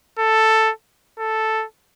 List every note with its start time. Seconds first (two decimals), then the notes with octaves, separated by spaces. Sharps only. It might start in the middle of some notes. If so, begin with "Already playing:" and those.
0.19 A4
1.19 A4